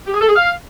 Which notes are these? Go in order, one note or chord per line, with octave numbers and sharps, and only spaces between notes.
G4
G#4
A4
G#4
F5